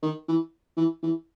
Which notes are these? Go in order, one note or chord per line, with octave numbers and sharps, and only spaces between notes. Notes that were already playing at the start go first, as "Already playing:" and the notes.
D#3
E3
E3
E3